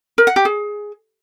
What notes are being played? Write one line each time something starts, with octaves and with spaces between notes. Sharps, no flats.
A#4
F#5
G4
G#4